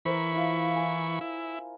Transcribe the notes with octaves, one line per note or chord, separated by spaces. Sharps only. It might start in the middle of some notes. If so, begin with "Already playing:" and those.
E3 A#4 C5 B5 C#6
E4 F4
G#5
E4